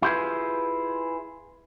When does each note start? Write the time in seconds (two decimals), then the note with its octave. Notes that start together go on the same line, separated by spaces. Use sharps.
0.02 E4 F4 G4 G#4 B4